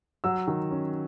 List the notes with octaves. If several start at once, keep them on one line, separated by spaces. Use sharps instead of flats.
F#3 E6
D#3
C#4